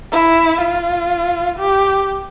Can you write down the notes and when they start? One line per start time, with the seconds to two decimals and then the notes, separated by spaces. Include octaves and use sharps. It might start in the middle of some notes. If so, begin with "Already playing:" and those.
0.12 E4
0.61 F4
1.59 G4